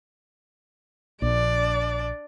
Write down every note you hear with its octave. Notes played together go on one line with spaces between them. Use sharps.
A#1 D4 D5